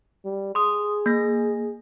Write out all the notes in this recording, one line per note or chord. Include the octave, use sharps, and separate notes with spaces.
G3
G#4 C6 D#6
A#3 A#6